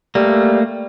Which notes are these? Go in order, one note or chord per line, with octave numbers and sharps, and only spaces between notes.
G3 A3 A#3